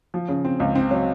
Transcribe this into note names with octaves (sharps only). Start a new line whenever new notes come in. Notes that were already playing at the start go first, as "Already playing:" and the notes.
F3
C#3
C4
C#2
C4
F#3